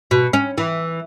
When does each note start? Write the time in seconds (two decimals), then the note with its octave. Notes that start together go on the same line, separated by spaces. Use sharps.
0.11 B2
0.33 C#4
0.58 E3